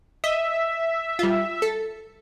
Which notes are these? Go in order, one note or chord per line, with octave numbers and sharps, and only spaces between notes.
D#5 E5
G3 F4
A4